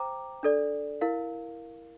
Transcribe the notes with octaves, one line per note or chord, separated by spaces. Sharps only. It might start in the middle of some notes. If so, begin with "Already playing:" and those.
Already playing: C5 G5 A#5 D6
D4 A4 D5
E4 A#4 F5